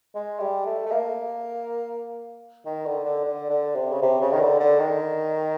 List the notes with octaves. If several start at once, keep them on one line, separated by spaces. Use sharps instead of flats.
G#3
G3
A3
A3
A#3
D#3
D3
D3
D3
D3
C3
C#3
C3
C#3
D#3
D3
D3
D#3